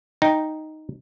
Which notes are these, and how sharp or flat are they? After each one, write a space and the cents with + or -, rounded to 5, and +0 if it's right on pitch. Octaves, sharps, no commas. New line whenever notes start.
D#4 +0 G5 +0